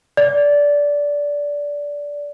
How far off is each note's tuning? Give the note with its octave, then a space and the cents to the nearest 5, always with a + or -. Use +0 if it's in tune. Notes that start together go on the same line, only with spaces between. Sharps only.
D5 -15